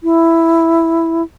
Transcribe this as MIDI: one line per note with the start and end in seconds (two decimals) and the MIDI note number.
0.04 1.22 64